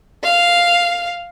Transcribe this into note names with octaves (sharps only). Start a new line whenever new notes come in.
F5